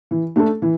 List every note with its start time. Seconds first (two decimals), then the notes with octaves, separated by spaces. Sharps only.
0.11 E3
0.36 A3 D4 A4
0.62 E3